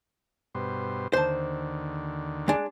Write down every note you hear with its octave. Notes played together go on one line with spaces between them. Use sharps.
G2 B2 C5
D#2 D3 C5 A5
G#3 D4